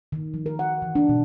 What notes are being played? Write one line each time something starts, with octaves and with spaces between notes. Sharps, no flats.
D#3
F3
A#4
F#5
E3
D4
B2